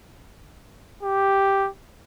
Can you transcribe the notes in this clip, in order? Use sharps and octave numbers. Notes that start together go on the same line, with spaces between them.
G4